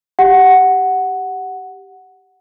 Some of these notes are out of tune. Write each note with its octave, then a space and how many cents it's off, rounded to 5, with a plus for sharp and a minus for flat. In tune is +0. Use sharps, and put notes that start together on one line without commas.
G4 +0 F#5 +0